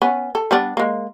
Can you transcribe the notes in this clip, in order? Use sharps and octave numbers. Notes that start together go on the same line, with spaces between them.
B3 C#4
A4
G3 B3 D4
G#3 A#3